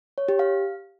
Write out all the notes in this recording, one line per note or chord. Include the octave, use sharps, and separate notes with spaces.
C#5
G4
F5